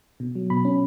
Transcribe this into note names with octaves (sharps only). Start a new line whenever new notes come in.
B2
F#3
B2 B5
C#4